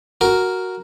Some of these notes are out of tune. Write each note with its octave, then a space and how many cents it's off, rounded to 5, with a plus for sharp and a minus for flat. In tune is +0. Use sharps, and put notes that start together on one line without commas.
F#4 +5 A#4 +0